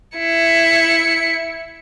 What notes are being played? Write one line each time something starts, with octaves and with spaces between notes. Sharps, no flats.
E4 C#7